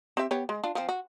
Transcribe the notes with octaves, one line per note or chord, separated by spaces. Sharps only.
C4 G4 E5
B3 G4 C#5
G#3
D4 F4
F3 C4
F#4